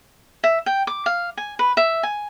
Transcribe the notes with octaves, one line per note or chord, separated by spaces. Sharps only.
E5
G5
D6
F5
G#5
B4
E5
G#5